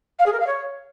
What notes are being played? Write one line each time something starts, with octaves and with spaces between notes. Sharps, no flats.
F5
G#4
A#4
F5
C#5